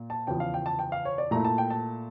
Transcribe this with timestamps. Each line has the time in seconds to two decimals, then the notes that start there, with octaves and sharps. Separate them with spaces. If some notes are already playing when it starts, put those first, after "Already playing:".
Already playing: A#2
0.10 A5
0.27 E2 C#3 F3 G5
0.40 F5
0.54 G5
0.66 A5
0.79 G5
0.92 F5
1.05 C#5
1.18 D5
1.31 A#2 A3 E4 A#5
1.45 A5
1.58 G5
1.70 A5